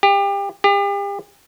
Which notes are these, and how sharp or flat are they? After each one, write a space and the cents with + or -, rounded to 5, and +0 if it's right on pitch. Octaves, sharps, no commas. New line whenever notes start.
G4 +30
G4 +40